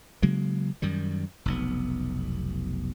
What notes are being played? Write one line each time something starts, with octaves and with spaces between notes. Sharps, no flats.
C#3 F#3 G#3 A#3
F#2 D#3 G3
F1 B1 B3